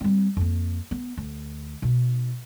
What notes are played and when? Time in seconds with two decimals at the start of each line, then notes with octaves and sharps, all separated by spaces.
0.01 G3 C4
0.37 F2 A#3
0.91 B3
1.17 D2
1.82 B2 D#4